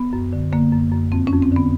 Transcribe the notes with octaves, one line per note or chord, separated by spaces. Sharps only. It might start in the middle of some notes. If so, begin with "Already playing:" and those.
Already playing: B3
F#2
D3
D3 A#3
F#2
F#2
F2 C4
C#4
F2
C4
D3 B3